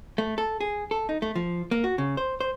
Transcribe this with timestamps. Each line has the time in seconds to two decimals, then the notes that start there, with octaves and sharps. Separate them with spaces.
0.18 A3
0.38 A4
0.61 G#4
0.91 A4
1.09 D#4
1.22 A3
1.36 F3
1.71 A#3
1.84 F#4
1.98 C#3
2.17 C5
2.41 C5